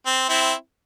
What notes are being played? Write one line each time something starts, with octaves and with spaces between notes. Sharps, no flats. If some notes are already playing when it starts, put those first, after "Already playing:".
C4
C4 E4